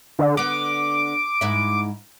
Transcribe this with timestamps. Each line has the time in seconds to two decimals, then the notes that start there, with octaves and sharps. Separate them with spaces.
0.19 D3
0.37 D3 B3 D6
1.41 G#2 E4